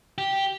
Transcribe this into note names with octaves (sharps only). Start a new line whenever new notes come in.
G4